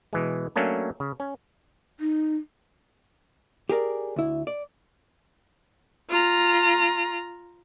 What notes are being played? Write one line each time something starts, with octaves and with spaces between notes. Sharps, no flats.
B2 E3 G#3
F#3 A3 A#3 C#4 D4
C#3
C#4
D#4
G4 G#4 A#4 D5
D2 E4
D5
F4 A#5